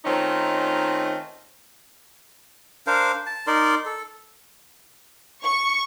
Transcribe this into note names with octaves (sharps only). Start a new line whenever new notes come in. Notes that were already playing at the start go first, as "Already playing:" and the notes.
D#3 A3 C4 C#4 D#4 F4
D4 A#4 C5 F5
A5
D#4 A#4 D5 C6
A4
C#6